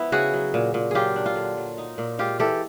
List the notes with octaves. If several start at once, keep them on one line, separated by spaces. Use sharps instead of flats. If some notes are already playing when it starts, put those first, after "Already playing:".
Already playing: F3 B3 E4
C#3 F#4 G#4
F#3
A#2
A#2
F#3 F4 G4 G#4
D4
F4
D3
F#3
D#4
A#2
G#3 F4 G4
E3 G4 A4